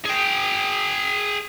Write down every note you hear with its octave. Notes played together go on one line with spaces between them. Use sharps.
G#4 G5